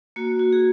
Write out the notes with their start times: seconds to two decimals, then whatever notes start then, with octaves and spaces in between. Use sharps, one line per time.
0.16 A#3 F#4
0.39 F#4
0.53 G#4